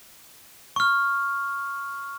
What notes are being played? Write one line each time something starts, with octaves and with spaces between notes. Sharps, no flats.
C#6 F6